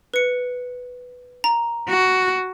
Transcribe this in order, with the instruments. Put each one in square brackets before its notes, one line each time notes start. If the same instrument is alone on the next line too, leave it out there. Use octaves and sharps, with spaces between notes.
[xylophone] B4 C#7
A#5
[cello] F#4